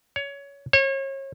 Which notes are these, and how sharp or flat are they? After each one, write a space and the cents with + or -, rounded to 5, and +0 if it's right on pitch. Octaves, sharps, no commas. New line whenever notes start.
C#5 +20
C#5 -35